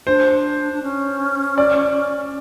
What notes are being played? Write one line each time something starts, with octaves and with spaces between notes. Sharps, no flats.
D4 C5
D4
C#4
D5